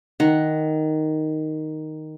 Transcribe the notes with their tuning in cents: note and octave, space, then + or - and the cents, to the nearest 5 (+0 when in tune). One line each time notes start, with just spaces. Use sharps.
D#3 +0 F#5 +0